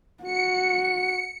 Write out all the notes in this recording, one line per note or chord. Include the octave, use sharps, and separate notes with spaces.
F#4 C#7